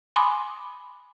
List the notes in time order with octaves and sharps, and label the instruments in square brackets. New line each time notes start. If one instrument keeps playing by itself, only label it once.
[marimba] G#5 B5 C6 D6 D#6